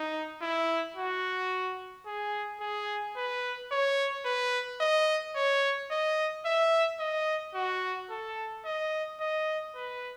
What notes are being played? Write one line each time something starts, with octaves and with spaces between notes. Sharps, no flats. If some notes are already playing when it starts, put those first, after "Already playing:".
Already playing: D#4
E4
F#4
G#4
G#4
B4
C#5
B4
D#5
C#5
D#5
E5
D#5
F#4
A4
D#5
D#5
B4